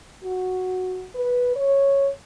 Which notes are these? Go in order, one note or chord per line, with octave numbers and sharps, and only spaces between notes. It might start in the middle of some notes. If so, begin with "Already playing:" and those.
F#4
B4
C#5